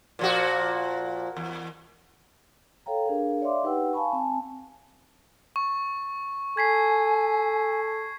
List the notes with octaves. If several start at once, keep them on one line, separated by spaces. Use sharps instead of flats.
A#2 F3 F#4
E2
A4 C#5 F5 G5 A#5
D4 G#4 A#4 F5
C#5 D5 E5 F5 C6 D6
D#4 G4 B4 F#5 G5 E6
F5 G#5 A5 B5 C#6
C4 G#5 A5
C#6
A4 G#5 G#6 B6 C7